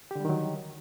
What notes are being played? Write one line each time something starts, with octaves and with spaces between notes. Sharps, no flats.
D3 D#3 F#3 G3 G4